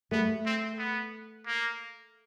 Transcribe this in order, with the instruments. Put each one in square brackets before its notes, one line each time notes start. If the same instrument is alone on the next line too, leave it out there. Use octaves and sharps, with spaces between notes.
[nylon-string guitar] A3 [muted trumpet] B3
[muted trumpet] C4
B3
A#3